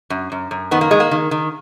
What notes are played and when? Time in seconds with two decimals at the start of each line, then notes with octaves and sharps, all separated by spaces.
0.10 F#2
0.32 F#2
0.51 F#2
0.71 D#3 B3
0.81 A#3
0.91 D#3 G#3
1.00 A#3
1.11 D#3
1.31 D#3